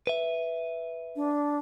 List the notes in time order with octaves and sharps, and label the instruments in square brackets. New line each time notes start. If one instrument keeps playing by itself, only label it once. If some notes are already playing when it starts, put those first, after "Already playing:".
[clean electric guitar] B4 E5
[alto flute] D4